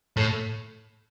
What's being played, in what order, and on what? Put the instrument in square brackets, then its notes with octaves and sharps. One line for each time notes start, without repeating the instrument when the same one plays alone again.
[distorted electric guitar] A2